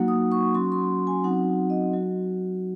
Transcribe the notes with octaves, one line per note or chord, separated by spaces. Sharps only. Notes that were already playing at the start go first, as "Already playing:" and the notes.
Already playing: F#3 A#3 D#4 F#4 F#5
D#6
C#6
F#3 C#4 F#4 C6
C6
G#5
F#3 C4 D#4 F#4 F#5
D#5
F#3 F#4